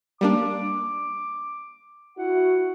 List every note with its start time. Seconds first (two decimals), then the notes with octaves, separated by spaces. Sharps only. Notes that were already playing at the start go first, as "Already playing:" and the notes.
0.21 G3 A#3 D4 D6
2.17 E4 F#4 F#5